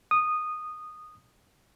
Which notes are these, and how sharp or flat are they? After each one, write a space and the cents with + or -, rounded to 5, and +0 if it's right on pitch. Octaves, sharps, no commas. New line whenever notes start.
D#6 -15